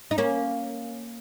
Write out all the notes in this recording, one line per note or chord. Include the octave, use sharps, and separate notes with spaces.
D#4
A#3 C#4